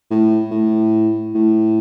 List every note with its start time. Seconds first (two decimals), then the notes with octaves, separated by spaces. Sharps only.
0.11 A2
0.51 A2
1.35 A2